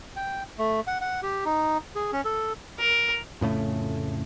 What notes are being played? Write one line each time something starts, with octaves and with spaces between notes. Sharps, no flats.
G5
A3
F#5
F#5
G4
D#4
G#4
C#4
A4
A#4
F2 A2 C#3 A3